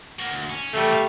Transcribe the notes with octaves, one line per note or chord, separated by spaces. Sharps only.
A#3 F#4
D2
C#4
C3 E3 G3 A3
F5